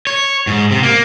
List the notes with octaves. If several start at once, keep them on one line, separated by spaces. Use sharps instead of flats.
C#5
G#2
C3
A#3